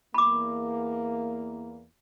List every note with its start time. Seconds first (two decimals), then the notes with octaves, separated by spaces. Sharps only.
0.14 E2 A#3 B5 D6